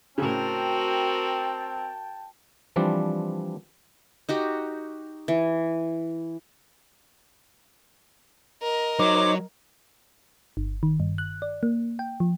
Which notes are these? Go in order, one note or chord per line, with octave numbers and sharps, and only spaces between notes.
A2 C#3 C4 F#4 A#4 G5 A5
E3 F3 G3 C4 D4
D#4 F#4 G4
E3
A#4 D#5
F#3 D#4 C5 C#5 D6
G1
D#3
G2
F#6
D5
A#3
G5
F3